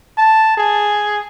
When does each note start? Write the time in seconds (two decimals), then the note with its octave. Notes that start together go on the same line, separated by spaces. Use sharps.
0.18 A5
0.57 G#4